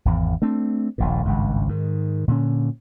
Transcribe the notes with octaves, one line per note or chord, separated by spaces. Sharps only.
G#1 E2
A3 C4 D4
D#1 A#1 A#2
G#1 C#2 G2
G#2 D#3
A#2 D3 F3 C#4